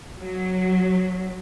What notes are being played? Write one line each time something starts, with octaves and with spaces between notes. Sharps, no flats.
F#3